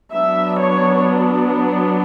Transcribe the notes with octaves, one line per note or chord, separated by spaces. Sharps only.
F#3 B3 D4 E5
C#5